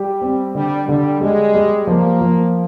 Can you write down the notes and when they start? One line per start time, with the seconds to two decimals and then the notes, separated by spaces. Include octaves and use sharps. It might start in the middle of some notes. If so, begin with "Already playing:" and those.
Already playing: G3 G4
0.21 C4
0.55 D3 G3
0.87 D3 G3
1.21 G3 G#3
1.54 G3
1.87 F3 A#3
2.21 F3